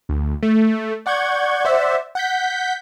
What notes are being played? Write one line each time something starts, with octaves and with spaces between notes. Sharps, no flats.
D2
A3
D5 F#5 C#6 G6 G#6
C5 D5 E5 F#5
F#5 G6 B6